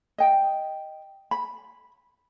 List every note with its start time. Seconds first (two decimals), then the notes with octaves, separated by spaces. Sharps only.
0.18 D#5 G5
1.31 B5